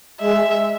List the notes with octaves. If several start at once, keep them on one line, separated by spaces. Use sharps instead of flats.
G#3 E5